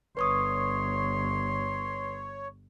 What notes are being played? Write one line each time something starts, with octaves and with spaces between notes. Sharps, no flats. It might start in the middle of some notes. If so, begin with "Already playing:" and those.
G1 B4 C#5 C6 C#6 D#6